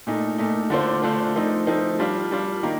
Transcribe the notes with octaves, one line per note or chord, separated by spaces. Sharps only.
A#2 A3 D#4
A#2 A3 D#4
D3 A3 D4 F4 C5
D3 A3 D4 F4 C5
F3 A3 C4 D#4
F3 A3 C4 D#4
G3 D4 F4
G3 D4 F4
D#3 A#3 F4 A#4